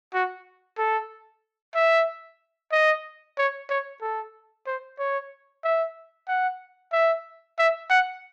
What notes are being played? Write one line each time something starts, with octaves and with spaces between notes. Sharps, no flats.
F#4
A4
E5
D#5
C#5
C#5
A4
C5
C#5
E5
F#5
E5
E5
F#5